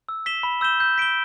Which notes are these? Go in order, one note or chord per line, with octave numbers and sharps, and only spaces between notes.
E6
B6 E7 G7
B5
E6 G6 E7 G7
G6
B6 D7 G7